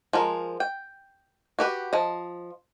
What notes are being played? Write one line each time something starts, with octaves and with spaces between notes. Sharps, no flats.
F3 G#3 A#4
G5
F#4 G4 B4
F3 D#5